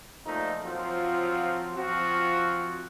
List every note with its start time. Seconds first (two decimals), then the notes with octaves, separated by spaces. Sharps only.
0.25 A#2 F3 A3 D#4
0.64 F3 F#3 C4 F4
1.75 F3 C4 F4 F#4